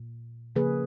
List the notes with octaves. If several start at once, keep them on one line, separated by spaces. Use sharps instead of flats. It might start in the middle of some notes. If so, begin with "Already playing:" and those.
Already playing: A#2
C#3 F3 A#3 G#4 B4